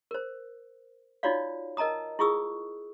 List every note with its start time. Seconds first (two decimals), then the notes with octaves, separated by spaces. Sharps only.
0.11 A#4 C5
1.23 D#4 F4 F#4 C#5 D5 F5
1.77 A#4 D#5 A5 A#5 D#6
2.19 E4 F4 G#4 C#6 D#6 E6